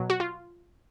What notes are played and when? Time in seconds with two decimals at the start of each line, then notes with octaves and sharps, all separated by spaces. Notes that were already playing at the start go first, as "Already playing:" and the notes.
Already playing: B2 F#3
0.10 F#4
0.20 F4